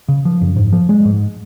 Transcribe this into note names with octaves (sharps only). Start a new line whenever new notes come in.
C#3
F3
F#2
G#2
F3
G#3
G#2